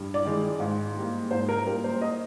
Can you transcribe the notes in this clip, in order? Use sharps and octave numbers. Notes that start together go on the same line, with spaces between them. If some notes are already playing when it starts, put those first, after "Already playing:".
Already playing: G2
D5
D#3 G#3
G#2
G3 A#3
G#2 C5
A#4
G3 A#3 A#4
C5
D#5